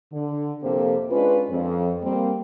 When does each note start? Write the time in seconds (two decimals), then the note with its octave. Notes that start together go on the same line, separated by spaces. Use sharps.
0.12 D3
0.63 F2 C3 A#3 G4 A4 C5
1.11 G#3 C#4 D4 F4 B4
1.49 F2
2.02 G3 A#3 C4